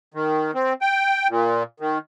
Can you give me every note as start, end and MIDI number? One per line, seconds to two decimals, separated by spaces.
0.14 0.51 51
0.55 0.73 60
0.81 1.28 79
1.30 1.63 46
1.80 1.98 51